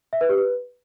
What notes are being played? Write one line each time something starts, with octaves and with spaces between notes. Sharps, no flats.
E5
B4
G4
B4